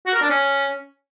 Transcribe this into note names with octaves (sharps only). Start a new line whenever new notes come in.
F#4
A#4
D4
C#4